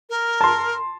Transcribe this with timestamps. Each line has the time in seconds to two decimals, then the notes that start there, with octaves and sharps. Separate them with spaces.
0.10 A#4
0.41 A5 C6